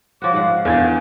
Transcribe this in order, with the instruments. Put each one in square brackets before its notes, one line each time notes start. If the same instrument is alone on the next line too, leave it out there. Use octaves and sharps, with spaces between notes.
[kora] F3 F#4 [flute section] C#5 C6 D6
[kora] G#2 F3 F#5 [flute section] F5
[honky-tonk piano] E2 G#6 A6 [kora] D3 G5